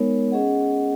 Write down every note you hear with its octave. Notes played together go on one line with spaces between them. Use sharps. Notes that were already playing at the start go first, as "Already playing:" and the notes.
Already playing: G#3 B3 D#4 A#4 C#5
C#4 G#4 D#5 F#5